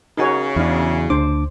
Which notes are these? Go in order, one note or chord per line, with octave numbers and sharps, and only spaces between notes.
C#3 D#4 F#4 A#4 C#5 G#5
E2 D4 E4 F#4 F5
D2 D4 C5 D6